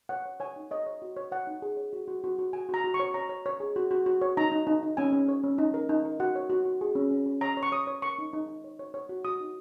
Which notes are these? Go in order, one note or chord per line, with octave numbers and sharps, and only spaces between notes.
C#5 F#5
C#5
C#5 G#5
D#4
C#5 D#5
C#5
F#4
C#5
C#5 F#5
D#4
G#4
C#5
F#4
F#4
F#4
F#4
F#4 G#5
F#4 A#5
F#4
C#6
C#5
C#5 A#5
C#5
C#5
G#4
F#4
F#4
F#4
C#5
D#4 A#5
D#4
D#4
D#4
C#4 G#5
C#4
C#5
C#4
D#4
A#4
D#4
A#4
F#4 F#5
C#5
F#4
F#4
G#4
C#4
C#4
C#4
C#5 A#5
C#5
C#6
C#5 D#6
C#5
A#4 C#6
D#4
D#4
D#4
C#5
C#5
C#5
F#4
F#4 D#6
D#4